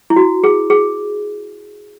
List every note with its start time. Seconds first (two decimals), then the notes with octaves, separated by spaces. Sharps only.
0.10 E4
0.16 F#4
0.44 G#4
0.70 G#4